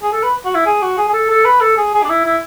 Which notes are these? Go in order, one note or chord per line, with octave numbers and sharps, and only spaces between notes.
G#4
A4
B4
F#4
E4
G#4
F#4
G#4
G#4
A4
A4
B4
A4
G#4
G#4
D4
E4
E4